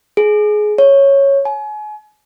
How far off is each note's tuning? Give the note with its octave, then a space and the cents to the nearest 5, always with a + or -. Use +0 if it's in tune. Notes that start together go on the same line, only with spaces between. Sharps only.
G#4 +20
C#5 -5
G#5 +35